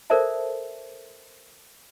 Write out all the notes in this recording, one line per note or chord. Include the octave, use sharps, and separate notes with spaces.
A4 A#4 C5 D5 E5 A5